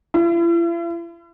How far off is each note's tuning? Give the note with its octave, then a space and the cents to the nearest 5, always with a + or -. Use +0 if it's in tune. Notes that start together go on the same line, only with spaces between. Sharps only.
E4 +45